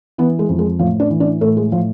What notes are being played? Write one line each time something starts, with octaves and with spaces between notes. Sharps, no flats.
E3 B3
G#3
F2
G#3
A2 F3
D4
E3
D4
A2 A3
G#3
A2 F3